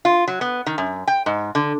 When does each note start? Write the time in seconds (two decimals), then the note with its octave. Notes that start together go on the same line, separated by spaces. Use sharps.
0.05 F4
0.28 F#3
0.41 B3
0.66 D#3
0.78 F#2
1.07 G5
1.26 G#2
1.55 D3